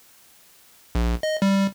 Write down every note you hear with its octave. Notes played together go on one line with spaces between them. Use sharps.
A#1
D#5
G3